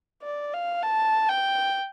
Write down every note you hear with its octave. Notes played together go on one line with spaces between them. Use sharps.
D5
F5
A5
G5